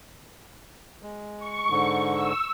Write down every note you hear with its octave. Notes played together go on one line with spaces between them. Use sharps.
G#3
C#6
G#2 D3
E6